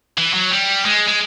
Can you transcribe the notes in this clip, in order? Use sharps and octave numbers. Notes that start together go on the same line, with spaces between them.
E3
F#3
G3
G#3
G#3